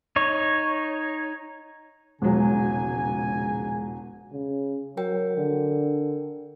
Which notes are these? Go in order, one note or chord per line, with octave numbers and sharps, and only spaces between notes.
D#4 C#5
E1 A#1 C#3 F#3 G#3 G#5
C#3
F#3 A#4 G5
D3